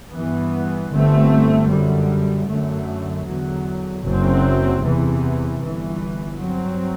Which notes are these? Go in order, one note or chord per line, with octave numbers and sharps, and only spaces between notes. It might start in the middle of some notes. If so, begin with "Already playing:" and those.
G2 E3 B3
G1 G2 D3 A3 C4
F#2 D3 G3
F#2 D3 A3
E2 D3 F#3
F#1 F#2 F#3 C4
E2 C3 E3
G1 G2 E3
G2 F#3 C4